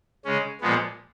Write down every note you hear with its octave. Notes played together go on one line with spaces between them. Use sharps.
C#3 G#3 C#4
A#2 F3 G#3 B3